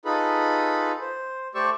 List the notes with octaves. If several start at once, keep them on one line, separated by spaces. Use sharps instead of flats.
D#4 F4 G#4 A4 B4 B5
C5
A3 G4 C5 D5 C#6 E6